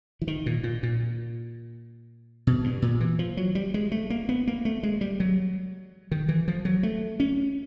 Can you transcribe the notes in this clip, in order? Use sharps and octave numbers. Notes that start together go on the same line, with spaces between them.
E3
D#3
A#2
A#2
A#2
B2
G2
A#2
E3
F3
F#3
G3
G#3
A3
A#3
B3
A#3
A3
G#3
G3
F#3
D#3
E3
F3
F#3
A3
C#4